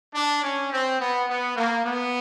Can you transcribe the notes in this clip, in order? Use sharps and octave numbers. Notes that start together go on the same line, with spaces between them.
D4
C#4
C4
B3
B3
A#3
B3